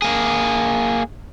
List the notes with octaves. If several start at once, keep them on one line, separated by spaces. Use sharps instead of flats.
A#3 G#4